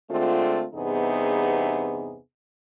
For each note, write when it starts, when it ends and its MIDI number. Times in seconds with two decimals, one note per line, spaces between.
0.10 0.66 50
0.10 0.66 56
0.10 0.66 57
0.10 0.66 60
0.10 0.66 65
0.74 2.18 40
0.74 2.18 43
0.74 2.18 48
0.74 2.18 59
0.74 2.18 63
0.74 2.18 68